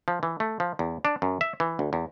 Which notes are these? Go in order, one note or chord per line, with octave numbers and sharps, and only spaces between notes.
F3
E3
A3
F3
E2
D4
F#2
E5
E3
D2
E2